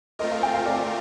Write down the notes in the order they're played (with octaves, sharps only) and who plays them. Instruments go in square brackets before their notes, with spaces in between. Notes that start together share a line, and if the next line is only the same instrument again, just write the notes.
[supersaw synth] A3 C4 F4 A#4 [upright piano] D#5
[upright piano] F5
G5
F5
D5